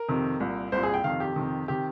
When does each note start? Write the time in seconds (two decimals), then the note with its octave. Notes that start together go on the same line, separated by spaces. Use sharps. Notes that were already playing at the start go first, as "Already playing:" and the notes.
Already playing: A#4
0.09 F2 C3 D#3
0.40 C2 A#2
0.72 C2 A#2 C5
0.83 G#4
0.94 G5
1.04 F2 C3 D#3 F5
1.20 G4
1.36 F2 C3 D#3
1.68 C3 D#3 G4